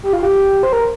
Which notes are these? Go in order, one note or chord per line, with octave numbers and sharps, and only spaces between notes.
G4
F4
G4
C5
A#4